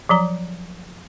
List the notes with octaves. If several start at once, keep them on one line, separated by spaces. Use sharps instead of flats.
F3 F#3 A#5